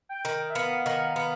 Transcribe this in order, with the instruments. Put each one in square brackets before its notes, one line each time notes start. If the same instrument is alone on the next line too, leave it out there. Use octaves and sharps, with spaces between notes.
[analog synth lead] G5
[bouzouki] D#3
[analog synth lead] E5
[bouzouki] B3 [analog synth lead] F5
[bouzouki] D#3
B3